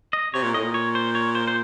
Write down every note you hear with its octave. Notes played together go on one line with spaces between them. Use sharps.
D#5
C3 C#5
A#2
A2 D#5
A#2
C#5
C5
C#5
C5
C5